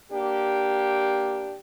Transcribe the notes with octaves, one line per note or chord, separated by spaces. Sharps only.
A#3 D4 G4